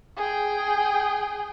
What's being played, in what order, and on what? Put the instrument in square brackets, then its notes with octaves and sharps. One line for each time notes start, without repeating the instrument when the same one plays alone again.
[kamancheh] G#4 G5